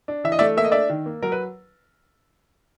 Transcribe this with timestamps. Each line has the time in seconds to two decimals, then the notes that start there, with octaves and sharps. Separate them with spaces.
0.08 D4
0.24 E3 E5
0.32 D#5
0.39 A3 D5 E5
0.57 A#3 E5
0.64 D#5
0.72 D4 D5 E5
0.90 D#3
1.06 A#3
1.22 F#3 A#4
1.32 B4